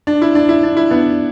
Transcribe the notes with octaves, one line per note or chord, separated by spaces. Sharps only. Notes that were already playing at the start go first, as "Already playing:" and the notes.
D4
E4
D4
E4
D4
E4
B3 D4